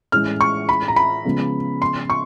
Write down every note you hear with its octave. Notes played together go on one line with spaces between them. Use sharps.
A2 E3 G#3 C#4 E4 F6
C#6
B5
A#5
B5
C#3 F3 G#3 B3
C6
C#6